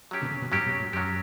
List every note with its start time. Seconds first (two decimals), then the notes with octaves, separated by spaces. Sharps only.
0.11 F#3 C#4 G4
0.22 B2 D3
0.31 C#3
0.42 B2
0.52 G2 F#3 C#4 G4
0.66 B2
0.80 A2
0.93 F#2 F#3 C#4 G4